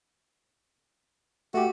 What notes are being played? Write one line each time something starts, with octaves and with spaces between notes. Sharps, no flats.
A3 F#4 G4